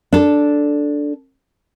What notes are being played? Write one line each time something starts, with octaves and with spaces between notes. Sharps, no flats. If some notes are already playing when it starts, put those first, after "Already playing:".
D4 A4